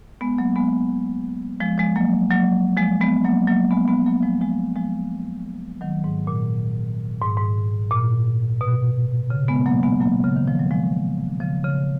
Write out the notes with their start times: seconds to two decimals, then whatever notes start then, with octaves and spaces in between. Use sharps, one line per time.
0.21 G#3 B3
0.38 F#3 A#3
0.56 G#3 B3
1.61 F3 G#3
1.78 F3 G#3
1.95 F#3 A#3
2.30 F#3 A#3
2.77 F3 G#3
3.01 G#3 B3
3.24 F#3 A#3
3.48 F#3 A#3
3.71 G#3 B3
3.88 G#3 B3
4.06 F#3 A#3
4.23 F3 G#3
4.41 F3 G#3
4.76 F3 G#3
5.81 D#3 F#3
6.04 G#2
6.27 A#2
7.21 G#2
7.37 G#2
7.91 A#2
8.61 B2
9.30 C#3
9.48 G#3 B3
9.66 F#3 A#3
9.83 G#3 B3
10.00 F#3 A#3
10.24 C#3
10.36 D#3
10.48 F3
10.60 F#3
10.71 F3 G#3
11.40 C#3 F3
11.64 C#3